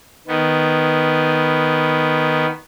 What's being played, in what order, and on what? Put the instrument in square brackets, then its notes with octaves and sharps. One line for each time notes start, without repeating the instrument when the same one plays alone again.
[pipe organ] D#3 B3